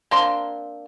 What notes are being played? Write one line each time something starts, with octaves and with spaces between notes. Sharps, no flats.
A#3 C4 D4 C6